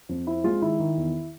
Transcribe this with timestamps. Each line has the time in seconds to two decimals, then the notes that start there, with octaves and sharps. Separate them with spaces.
0.09 F2
0.27 C4 E4
0.44 G#3 F4
0.62 D#3 E4
0.79 D#3
0.97 E2